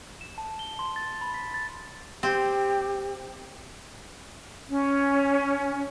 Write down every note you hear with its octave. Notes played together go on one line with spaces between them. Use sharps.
E7
A5
G7
C6
A6
B5
B6
A6
C4 G4
C#4